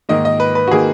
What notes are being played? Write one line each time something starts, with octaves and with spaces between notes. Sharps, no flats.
G#2 D#3 A#3 D#5
D#5
B4
B4
F#4
D#3 A#3 G#4